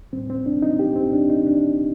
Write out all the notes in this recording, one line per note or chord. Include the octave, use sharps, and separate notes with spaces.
A2 G3 C4
C4
D4
D#4
G4
C4
D4
D#4
D4